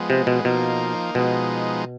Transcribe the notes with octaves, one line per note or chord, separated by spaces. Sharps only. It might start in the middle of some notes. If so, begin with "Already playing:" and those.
Already playing: F3 G#3 B3
C3
B2
B2 F3 A#3 D#4
B2 F3 G#3 B3 D#4